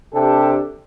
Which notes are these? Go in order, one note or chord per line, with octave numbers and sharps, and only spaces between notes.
C3 D4 G4 A4